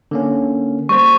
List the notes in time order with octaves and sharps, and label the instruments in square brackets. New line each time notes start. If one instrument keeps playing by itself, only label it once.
[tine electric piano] D3 A#3 C#4
[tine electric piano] G3 A#3 C5 [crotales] C#6